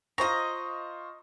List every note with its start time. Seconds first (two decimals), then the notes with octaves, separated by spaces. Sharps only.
0.18 F4 C5 D#5 A#5 C#6